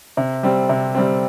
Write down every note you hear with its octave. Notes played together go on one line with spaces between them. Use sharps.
C3
G3 C4
C3
G3 C4